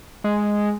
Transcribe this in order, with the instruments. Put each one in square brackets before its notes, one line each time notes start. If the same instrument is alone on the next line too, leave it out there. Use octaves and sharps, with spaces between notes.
[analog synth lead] G#3